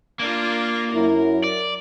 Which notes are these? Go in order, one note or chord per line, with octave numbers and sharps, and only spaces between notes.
A#3 D4 F4
F#2 F#3 E4 A#4
D5